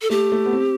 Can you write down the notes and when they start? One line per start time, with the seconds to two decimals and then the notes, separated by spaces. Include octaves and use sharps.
0.02 A4
0.10 A3 G4
0.32 A3
0.46 B3
0.53 C4